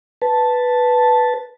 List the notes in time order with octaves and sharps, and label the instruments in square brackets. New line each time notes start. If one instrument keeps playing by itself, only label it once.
[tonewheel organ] B4 A5